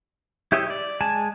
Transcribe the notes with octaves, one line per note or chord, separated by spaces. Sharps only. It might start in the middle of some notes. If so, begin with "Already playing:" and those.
E4 G4 C#5 D#5 E5
D5
G#3 G#5 A5